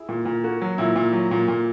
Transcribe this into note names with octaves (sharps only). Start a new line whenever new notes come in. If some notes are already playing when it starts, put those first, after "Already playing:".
Already playing: E4 G#4
A#2
A#2
A#3 F#4
F#3
A#2 E4
A#2
F#3
A#2
A#2